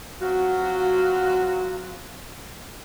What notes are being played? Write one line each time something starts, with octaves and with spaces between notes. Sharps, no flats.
F#3 C4 F4 F#4